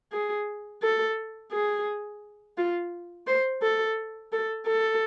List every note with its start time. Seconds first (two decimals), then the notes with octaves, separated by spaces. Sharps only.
0.12 G#4
0.83 A4
1.52 G#4
2.57 F4
3.27 C5
3.62 A4
4.32 A4
4.67 A4